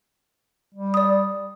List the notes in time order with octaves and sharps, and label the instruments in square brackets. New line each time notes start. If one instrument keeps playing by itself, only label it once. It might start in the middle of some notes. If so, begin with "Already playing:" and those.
[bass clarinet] G3
[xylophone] D5 D#6